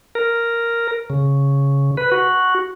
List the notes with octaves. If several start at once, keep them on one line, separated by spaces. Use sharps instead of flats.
A#4
C#3
B4
F#4